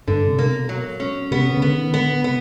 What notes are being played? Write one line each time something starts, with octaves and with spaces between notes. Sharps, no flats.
G2 D3
C3
A#3
B2
F#3
C#4
C3 B3
C#3
C#3
D3 B3
D#3
D3 B3
C3 B3